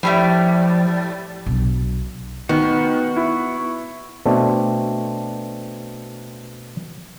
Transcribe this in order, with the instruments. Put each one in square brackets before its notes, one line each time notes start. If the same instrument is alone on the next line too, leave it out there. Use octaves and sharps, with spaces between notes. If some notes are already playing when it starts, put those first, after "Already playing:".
[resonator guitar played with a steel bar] A2 G3 A3 [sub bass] F3
[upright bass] B1 D4
[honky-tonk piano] D#3 [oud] B3 [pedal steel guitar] F#4
[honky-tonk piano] E4
[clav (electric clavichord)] B2 A3 C4 D4